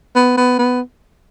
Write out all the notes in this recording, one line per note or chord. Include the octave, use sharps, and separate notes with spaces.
B3
B3
B3